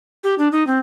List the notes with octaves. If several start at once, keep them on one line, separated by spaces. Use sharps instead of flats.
G4
D4
D#4
C4